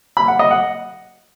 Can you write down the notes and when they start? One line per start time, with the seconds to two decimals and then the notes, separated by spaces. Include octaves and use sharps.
0.17 B5
0.28 F#5
0.39 D#5
0.51 F#5